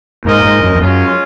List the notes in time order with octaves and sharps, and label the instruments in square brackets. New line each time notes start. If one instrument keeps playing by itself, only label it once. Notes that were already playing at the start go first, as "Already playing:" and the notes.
[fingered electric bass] G#2 [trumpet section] A#3 F4 A#4 D#5
[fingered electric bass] G#2
F#2
F2
[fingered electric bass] F#2 [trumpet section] G#3 C#4 F4